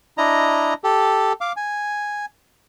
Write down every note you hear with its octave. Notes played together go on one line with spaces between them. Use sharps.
D4 E4 D#5 A#5
G4 A4
F5 D6
G#5